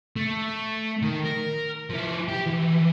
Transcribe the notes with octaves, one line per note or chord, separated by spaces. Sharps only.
A3
D#3
A#4
F3 E4
G4 G5
E3 F3